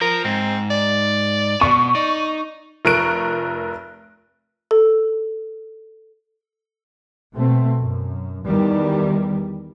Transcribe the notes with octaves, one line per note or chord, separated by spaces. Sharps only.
F3 A#4
G#2 C4
D5
B2 C#6
D#4 D5
F1 F3 A#4 C#6 F#6 D7
A4
B2 A3 C4
F#2
E2 D#3 G3